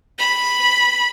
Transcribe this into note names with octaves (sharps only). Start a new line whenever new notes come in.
B5